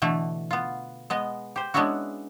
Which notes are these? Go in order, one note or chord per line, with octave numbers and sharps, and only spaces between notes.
B2 D3 E3 A3
B3 F4
G#3 B3 D#5
G4 C5
G#3 B3 C#4 D4 E4 F#4